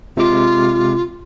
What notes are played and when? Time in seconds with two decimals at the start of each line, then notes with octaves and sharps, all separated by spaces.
0.17 C3 G#3 F4 D6